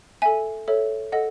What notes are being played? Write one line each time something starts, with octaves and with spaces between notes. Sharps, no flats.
A4 E5 G#5
A4 C#5 E5
A4 D#5 F#5